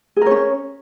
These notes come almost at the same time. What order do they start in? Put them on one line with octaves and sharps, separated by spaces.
G#4 A#4 C#5 C#4